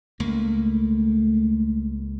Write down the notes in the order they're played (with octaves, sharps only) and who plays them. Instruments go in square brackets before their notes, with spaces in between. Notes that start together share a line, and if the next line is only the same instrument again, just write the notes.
[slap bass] C#2 A#3 [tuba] A3